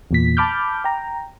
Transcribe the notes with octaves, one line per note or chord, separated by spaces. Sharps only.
E2 A#2 B6
A5 B5 D6 F6 G6
G5 A#5